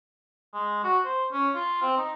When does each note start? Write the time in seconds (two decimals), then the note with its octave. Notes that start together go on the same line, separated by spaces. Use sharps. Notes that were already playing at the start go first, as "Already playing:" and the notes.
0.54 G#3
0.84 F#4
1.04 C5
1.32 C#4
1.55 F4
1.82 C4
1.97 D#4